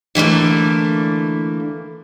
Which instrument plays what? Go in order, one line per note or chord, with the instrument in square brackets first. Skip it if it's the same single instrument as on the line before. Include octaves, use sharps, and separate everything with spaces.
[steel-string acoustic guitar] D3 E3 A3 A#3